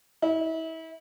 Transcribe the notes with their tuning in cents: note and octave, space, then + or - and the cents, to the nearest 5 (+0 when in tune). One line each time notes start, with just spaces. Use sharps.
E4 -35